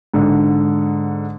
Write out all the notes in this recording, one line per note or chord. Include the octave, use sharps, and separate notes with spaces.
G#2 D3